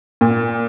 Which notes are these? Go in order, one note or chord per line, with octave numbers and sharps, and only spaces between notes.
A#2